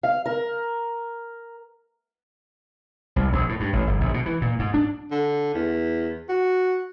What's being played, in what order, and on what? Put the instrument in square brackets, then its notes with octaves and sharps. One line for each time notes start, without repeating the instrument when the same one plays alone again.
[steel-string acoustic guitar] F5
A#4
[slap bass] C2
A#1
A2
G2
A1
G1
A#1
B2
E3
A#2
G#2
D4
[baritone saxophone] D3
E2
F#4